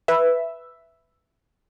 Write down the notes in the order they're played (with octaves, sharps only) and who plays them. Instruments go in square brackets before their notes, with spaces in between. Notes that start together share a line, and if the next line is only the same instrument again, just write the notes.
[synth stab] B4 E5